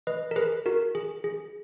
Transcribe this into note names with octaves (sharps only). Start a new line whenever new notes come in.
B4 D#5
A#4
G#4 B4
F#4 A#4
G#4
G#4